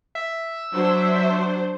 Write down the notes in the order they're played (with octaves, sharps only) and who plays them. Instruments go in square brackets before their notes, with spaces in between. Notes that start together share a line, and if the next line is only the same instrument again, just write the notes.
[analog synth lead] E5
[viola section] F#3 D4 C5